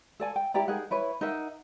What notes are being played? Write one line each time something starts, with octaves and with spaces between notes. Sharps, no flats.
A4 D5 G#5
G5
E4 G4 D5 A#5
D#4 G#4 A#4 F#5
E4 B4 C#5
D#4 A#4 E5 F#5